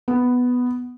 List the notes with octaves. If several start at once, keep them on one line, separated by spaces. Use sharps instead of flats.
B3